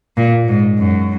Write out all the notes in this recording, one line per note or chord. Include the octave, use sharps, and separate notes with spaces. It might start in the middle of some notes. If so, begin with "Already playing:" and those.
A#2
G#2
F#2